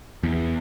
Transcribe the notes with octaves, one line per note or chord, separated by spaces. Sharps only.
E2